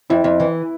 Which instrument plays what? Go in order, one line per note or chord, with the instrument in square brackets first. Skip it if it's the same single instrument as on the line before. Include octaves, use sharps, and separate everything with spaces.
[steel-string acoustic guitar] F2 [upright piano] E4
[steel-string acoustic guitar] F2
E3